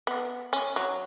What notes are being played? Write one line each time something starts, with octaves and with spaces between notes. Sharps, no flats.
B3
C#4
F#3